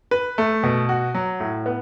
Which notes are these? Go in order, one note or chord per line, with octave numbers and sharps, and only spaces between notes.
B4
A3
B2
F#4
F#3
A2
B3